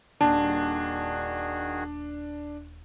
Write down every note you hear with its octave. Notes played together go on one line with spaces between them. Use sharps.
D#1 D#3 D4 F#4 G#4 A5